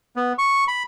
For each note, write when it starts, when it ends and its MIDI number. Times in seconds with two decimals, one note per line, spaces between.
0.16 0.33 59
0.38 0.64 85
0.68 0.83 83